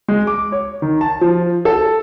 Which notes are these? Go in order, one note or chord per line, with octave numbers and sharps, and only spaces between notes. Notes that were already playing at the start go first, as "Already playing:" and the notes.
G#3
D6
C#5
D#3
A5
F3
A4